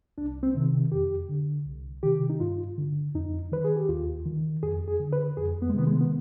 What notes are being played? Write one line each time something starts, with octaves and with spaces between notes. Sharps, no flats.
C2 D4
C4
C3 D#3
F2 G4
D3
C2
C3 D#3 G4
D#4
G2 F4
D3
F2 D#4
D#3 B4
G#4
G4
D#2 F4
D#3
F2 G#4
G#4
D3
B4
F2 G#4
B3
G#3
C3 D#3 B3
G#3
B3